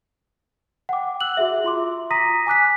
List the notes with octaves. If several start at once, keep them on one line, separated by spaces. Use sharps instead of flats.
F#5 G5 D6
E6 F#6 F#7
F#4 G#4 E5
F4 C6 D6
A#5 D#6 A#6 B6 D#7
G#5 D6 F#6 B6